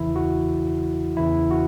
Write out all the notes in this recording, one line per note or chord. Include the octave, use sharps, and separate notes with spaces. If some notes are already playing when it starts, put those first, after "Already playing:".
Already playing: E2 C#3 E3 E4
F#4
E2 C#3 E3 E4
F#4